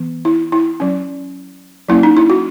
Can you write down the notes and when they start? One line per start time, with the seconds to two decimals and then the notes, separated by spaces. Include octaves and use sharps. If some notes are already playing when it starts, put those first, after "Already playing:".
Already playing: E3 B3
0.25 E4
0.52 E4
0.80 F#3 C#4
1.89 F#3 A#3 C#4 E4
2.03 D#4
2.17 E4
2.30 F#4